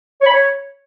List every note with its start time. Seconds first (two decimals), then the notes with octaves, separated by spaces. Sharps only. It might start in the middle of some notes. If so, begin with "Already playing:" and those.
0.22 C#5
0.27 B5
0.32 C#5